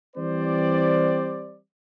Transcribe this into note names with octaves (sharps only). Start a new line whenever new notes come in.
E3 G3 C4 C5 D5